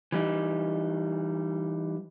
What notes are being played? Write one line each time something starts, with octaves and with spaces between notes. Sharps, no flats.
E3 G3 D#4